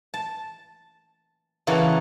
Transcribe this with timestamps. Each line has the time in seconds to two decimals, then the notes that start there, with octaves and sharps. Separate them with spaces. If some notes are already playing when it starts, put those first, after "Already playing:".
0.14 A5
1.67 C#3 E3 A#3 F#4 A4